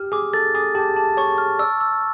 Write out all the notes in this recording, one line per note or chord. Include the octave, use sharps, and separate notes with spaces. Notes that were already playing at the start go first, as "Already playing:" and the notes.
Already playing: G4 F6
G#4 D6
A4 A6
G#4 D6
G4 A5
A5
C#5 C#6
F6
D5 E6
E6